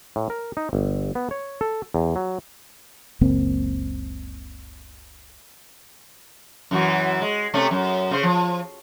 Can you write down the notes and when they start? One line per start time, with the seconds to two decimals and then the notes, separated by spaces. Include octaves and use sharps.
0.16 A2
0.30 A#4
0.57 D#4
0.73 G1
1.15 B3
1.31 C#5
1.61 A4
1.94 E2
2.16 F#3
3.21 F#1 C#2 A#3 C4
6.71 F#2 E3 F#4
7.22 G#3
7.54 C3 A3 C#4
7.71 F#2
8.11 C#3 C5
8.23 F3